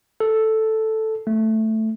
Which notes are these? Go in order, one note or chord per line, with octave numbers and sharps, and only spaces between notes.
A4
A3